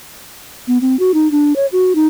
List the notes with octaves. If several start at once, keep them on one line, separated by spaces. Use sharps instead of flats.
B3
C4
F#4
D#4
D4
C#5
F#4
D#4